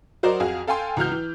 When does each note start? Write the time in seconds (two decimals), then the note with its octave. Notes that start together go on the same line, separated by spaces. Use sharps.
0.23 F#3 F#4 A#4 C5 D5 D#5
0.40 F2 F#4 G#4 F5
0.68 A4 F5 G5 G#5 C6
0.97 C#2 E3 F#4 F6 G6
1.12 E3